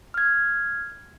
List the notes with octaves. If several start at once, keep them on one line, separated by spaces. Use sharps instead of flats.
F6 G#6